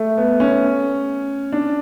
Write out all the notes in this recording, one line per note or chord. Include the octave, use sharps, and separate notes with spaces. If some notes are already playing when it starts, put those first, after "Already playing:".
Already playing: A3
B3
C#4
D4